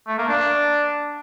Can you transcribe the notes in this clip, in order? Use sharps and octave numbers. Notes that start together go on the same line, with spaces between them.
A3
A#3
D4